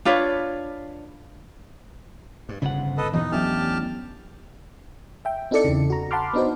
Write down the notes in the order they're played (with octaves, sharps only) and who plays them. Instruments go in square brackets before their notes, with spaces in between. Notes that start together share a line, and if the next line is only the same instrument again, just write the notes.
[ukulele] D4 F4 B4 C#5
[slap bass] G2
[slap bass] G1 F2 G#2 [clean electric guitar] C#3 F#5
[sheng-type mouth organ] A4 B4 D#5
[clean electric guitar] E2 [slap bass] A#2 E3 F3 [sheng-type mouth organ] D#4 [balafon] D#5
[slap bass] A1 C#4 D4 [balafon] F#3 B3 [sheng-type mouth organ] G4 A5 F6
[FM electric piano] E5 G5
C4 D#4 E4 A4 D5 C#7
E2 C#3
F#4 A#5
F#5 A5 B5 C6 D6 F6
B3 D4 D#4 F#4 C5